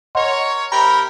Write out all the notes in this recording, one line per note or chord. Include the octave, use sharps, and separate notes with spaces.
A#4 C#5 D#5 F#5 C6
C3 G4 A#4 A#5 B5